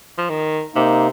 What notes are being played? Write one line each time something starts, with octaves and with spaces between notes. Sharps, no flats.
F3
D#3
C3 A#3 D#4